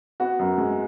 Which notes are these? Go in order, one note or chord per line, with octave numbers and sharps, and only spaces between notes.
B3 F#4
F#2
G#3